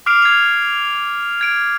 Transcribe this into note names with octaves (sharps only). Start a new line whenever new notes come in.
D6 F6 C7 D7 F7
G#6 C7 F7
G#6 D7